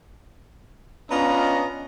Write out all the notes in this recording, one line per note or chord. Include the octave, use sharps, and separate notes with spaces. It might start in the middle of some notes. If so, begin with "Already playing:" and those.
B3 C#4 D4 F4 D#5 A#5